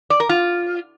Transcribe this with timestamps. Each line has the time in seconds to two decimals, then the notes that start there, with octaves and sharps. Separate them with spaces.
0.10 D5
0.20 A#4
0.29 F4